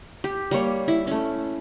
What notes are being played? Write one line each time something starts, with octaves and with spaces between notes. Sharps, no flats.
G4
G3 A#3 C#5
E4
A3 C#4